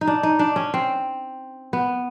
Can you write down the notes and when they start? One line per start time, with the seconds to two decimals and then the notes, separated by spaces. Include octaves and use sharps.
0.01 D#4
0.07 D4
0.23 D#4
0.39 D4
0.56 C#4
0.74 C4
1.73 B3